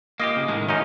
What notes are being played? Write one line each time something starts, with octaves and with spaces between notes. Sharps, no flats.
A#3 F4 G4 D#5
C#3
A2 D#3 G#3
F#2 C#4 D#4 F4